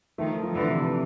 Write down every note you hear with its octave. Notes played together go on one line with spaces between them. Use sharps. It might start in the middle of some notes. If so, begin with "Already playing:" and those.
D#3 F3 A3
F3
D3 E3
C3